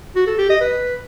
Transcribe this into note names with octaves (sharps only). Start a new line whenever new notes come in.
F#4
A4
G4
D#5
B4